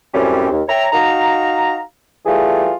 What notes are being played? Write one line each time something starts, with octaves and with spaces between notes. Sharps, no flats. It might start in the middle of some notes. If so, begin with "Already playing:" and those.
F#2 A2 G3 C4 C#4
D#2
C#5 E5 G5 A#5
D#4 F#4 F5 A#5
E3 G3 A3 F4 G#4